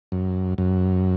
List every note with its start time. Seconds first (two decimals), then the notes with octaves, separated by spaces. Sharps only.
0.12 F#2
0.58 F#2